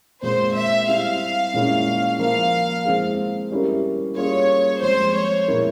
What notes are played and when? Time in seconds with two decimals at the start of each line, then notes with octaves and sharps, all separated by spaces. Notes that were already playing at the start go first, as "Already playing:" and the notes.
0.22 A#2 G#3 C4 F4 C5
0.55 E5
0.87 G3 C4 E4 F5
1.54 A#2 G#3 C#4 E4
2.19 F3 A#3 F4 A#4 F5
2.85 G#3 C4 E4 G#4
3.51 G3 C#4 E4 G4 A#4
4.16 G3 A#3 C#4 F4 G#4 C#5
4.82 F3 G#3 C4 C5
5.15 C#5
5.48 A#2 G#3 E4 A#4